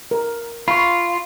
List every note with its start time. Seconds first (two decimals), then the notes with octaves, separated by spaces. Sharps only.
0.11 A#4
0.68 F4 B5 C#6